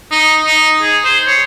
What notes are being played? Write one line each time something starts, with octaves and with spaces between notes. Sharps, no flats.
D#4
D#4
G#4
C5
C#5